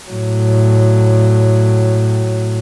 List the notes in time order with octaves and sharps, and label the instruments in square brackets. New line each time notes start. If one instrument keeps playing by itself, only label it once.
[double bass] A2 F#3